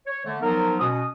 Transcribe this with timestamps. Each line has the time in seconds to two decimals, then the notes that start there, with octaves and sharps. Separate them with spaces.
0.07 C#5
0.25 D3 A3
0.42 F3 F#3 B3 D#4 A#4
0.80 B2 C#4 F#4 D#6